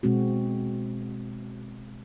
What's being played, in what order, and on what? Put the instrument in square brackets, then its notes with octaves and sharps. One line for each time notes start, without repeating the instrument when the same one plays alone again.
[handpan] B2 G#3 C4 F#4